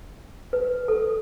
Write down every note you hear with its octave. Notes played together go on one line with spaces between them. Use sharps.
B4
A4